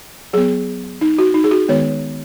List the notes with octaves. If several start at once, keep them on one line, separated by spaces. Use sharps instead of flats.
F#3 B3 G#4
D#4
F#4
D#4
G#4
F#4
D#3 G#3 B3 C#5